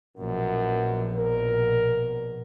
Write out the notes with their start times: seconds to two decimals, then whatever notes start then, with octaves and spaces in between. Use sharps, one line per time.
0.17 A#1 F#2 B2
1.16 A#4